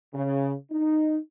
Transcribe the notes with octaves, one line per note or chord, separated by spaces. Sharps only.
C#3
D#4